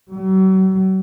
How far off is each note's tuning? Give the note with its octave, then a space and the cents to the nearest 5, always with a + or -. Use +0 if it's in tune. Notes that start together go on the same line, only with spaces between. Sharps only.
F#3 +40